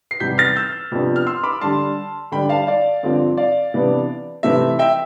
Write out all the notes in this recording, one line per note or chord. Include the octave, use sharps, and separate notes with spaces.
C7
E2 C3 G3 G6 B6
F6 A6
E6 G6
F2 C3 F3 B3 D4
F6
C6 E6
B5 D6
D3 G3 D4 A5 C6
D3 G3 D4 G5 B5
F5 A5
D5 F5
G2 D3 F3 C4
D5 F5
C3 E3 B3 D4
C3 E3 A3 C4 E5
E5 G5